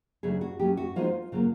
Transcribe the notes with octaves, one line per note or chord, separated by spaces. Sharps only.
C#3 F#3 A3 D4 G#4
F#4
F#3 A3 C#4 G4
F#4
F3 G#3 B3 D#4 F4
C#3 F#3 A#3